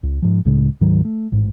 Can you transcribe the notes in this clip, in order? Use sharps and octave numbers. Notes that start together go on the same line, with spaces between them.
C#2
G#2 F3
C#2 A2 C#3 G#3
D2 G#2 D#3 F#3
A3
A1 G#2